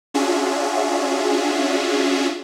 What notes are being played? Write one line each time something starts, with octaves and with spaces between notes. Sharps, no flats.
C#4 D4 F4 F#4 G#4 E5